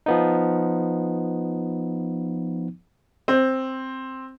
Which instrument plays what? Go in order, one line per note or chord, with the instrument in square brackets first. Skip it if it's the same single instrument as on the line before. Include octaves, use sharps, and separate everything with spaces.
[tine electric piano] F3 B3 D#4
[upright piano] C4